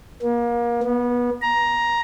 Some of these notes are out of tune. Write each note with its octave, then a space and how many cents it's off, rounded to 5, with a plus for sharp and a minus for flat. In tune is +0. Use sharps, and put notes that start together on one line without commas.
A#3 +30
B3 -25
A#5 +10